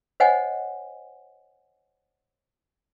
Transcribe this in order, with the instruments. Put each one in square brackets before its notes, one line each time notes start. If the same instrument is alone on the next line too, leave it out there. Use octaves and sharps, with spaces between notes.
[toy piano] C5 C#5 D#5 F#5 G#5